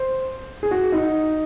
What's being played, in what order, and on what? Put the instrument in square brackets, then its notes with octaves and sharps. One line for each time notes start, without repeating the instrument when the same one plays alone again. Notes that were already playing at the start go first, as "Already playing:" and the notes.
Already playing: [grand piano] C5
G#4
F#4
D#4